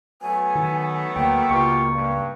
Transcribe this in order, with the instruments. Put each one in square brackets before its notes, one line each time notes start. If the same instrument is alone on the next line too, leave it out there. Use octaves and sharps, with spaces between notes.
[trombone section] F#3 A3 B3 [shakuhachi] G#5
[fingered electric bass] D#3
[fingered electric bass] D2 [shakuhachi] A#3 [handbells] G5
[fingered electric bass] C#2 [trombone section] B2 F4 G4 [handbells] C#6 C#7
[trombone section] G2